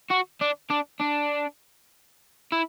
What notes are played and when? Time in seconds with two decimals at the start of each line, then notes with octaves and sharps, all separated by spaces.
0.10 F#4
0.41 D4
0.71 D4
1.01 D4
2.52 E4